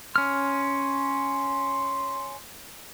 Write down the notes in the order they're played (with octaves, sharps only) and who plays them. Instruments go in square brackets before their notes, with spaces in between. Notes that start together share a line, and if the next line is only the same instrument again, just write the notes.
[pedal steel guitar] C#4 F6 [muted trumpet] C6